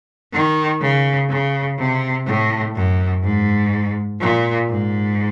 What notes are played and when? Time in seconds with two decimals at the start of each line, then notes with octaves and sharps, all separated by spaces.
0.32 D#3
0.81 C#3
1.29 C#3
1.78 C3
2.26 A2
2.75 F#2
3.23 G#2
4.20 A#2
4.68 G#2